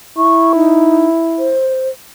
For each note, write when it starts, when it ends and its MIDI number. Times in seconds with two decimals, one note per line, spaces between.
0.17 1.57 64
0.17 0.53 85
0.55 1.07 63
1.39 1.89 72